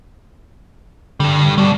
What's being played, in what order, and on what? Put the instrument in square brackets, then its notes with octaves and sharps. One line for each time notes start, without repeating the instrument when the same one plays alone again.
[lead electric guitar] G2 G3 [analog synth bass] D3
[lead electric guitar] B2 D4 [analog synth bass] G3